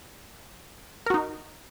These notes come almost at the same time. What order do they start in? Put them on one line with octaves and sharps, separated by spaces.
A#4 F#4 D#4